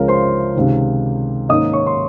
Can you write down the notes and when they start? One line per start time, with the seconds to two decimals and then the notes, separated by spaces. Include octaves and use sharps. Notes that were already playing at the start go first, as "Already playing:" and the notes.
Already playing: C#2 C#3 F3 G#3 C#4 A#4
0.08 C5 C6
0.55 C#2 C3 D#3
1.49 G#2 D#3 A#3 C#4 D#5 D#6
1.73 C#5 C#6
1.87 C6